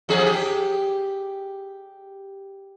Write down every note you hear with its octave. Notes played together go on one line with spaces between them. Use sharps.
F2 G3 G#4
G4